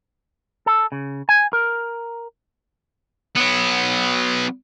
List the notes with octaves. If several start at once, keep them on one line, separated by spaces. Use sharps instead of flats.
A4
C#3
G#5
A#4
F#3 B3